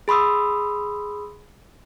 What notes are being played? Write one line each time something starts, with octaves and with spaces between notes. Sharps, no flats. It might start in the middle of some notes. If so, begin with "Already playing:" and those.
G#4 B5 C6 D#6 E6